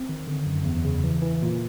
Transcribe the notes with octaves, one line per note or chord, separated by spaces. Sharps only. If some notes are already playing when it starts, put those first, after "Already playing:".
Already playing: C4
D#3
D3
F#2
E2
C#3
E3
E3
A#2